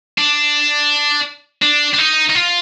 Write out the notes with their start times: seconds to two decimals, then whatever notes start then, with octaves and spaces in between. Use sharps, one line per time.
0.18 D4
1.62 D4
1.94 D4
1.99 D#4
2.30 D#4
2.35 F4